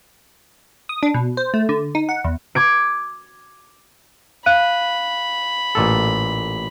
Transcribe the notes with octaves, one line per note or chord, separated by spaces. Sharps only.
D#6
D4
B2
C5
A3
D3
D#4
F#5
E2
D6 G#6 D7
F5 B5 F#6 D#7
A1 A#2 A4